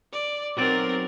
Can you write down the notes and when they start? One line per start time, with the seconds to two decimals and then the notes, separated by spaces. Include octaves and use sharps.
0.13 D5
0.57 B1 F#3 C4 A#4 D5